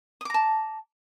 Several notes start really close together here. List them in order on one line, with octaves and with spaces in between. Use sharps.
D#6 D6 A#5 A5